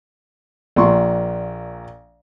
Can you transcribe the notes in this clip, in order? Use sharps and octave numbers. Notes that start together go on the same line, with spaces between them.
A#1 A#2 C6 C#6